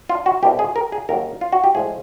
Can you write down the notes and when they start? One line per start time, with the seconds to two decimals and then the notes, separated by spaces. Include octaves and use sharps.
0.09 F4
0.26 F#4
0.43 C2 B2 G3 G4
0.59 G#4
0.76 A#4
0.92 G#4
1.09 D#2 C#3 F#3 A#4
1.41 F4
1.52 F#4
1.64 G4
1.75 A2 F3 G#3 G#4